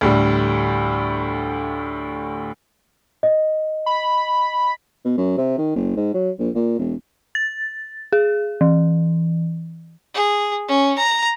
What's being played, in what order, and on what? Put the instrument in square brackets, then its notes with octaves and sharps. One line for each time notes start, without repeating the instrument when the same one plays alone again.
[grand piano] D2 A2 G3
[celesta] D#5
[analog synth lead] B5
[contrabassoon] B2
F#2
C3
D#3
F#1
G#2
F#3
A#1
A#2
E1
[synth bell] A6
G#4
E3
[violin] G#4
C#4
A#5